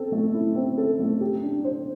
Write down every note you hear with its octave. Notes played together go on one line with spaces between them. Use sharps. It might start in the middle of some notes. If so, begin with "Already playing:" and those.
Already playing: C4 A4
A3
E4
C4
A4
A3
G4
D4
C5